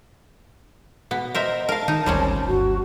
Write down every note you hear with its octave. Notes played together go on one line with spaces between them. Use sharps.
B2 B3
A#4 C5 D#5 E5
A#4 F5 A5
D#3 D#4
G#1 D2 G3 C4 C#4
G1 F#4